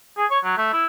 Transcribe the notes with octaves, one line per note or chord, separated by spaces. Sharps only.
G#4
C#5
F#3
A3
E4